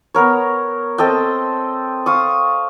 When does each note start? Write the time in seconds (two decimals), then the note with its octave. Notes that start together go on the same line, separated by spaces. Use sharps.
0.14 B3 A#4 C#5
0.98 C4 A4 D#5 G5
2.06 F5 C#6 D#6